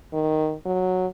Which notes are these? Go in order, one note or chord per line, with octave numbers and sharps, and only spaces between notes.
D#3
F#3